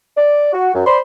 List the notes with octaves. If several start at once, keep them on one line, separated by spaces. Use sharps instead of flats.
D5
F#4
F#2
C5 D5 B5 C6